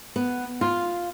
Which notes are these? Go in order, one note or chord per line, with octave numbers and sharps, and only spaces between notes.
B3
F4